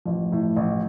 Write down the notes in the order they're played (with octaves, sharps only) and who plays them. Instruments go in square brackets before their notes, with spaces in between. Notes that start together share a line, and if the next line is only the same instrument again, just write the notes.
[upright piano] A1 [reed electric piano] F3
[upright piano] A2
A1